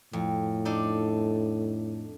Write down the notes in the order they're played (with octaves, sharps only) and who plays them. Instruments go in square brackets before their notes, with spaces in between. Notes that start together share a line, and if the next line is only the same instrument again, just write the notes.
[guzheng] F2 [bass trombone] A2
[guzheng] D4 D#4 A4